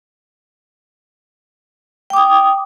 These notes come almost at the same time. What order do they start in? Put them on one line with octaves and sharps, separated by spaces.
G5 D6 D#6